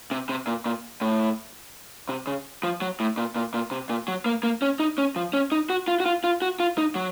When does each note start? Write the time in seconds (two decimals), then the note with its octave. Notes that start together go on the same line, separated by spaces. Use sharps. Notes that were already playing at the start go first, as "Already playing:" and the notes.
0.11 C3
0.29 C3
0.47 A#2
0.66 A#2
1.01 A2
2.09 C3
2.27 C#3
2.63 F3
2.82 F#3
3.00 A2
3.17 A#2
3.36 A#2
3.54 A#2
3.71 C3
3.89 A#2
4.08 F#3
4.26 A#3
4.43 A#3
4.62 C#4
4.80 D#4
4.98 C#4
5.16 F3
5.33 C#4
5.52 D#4
5.70 F#4
5.88 F4
6.00 F#4
6.06 F4
6.24 F4
6.42 F#4
6.60 F4
6.78 D#4
6.95 F#3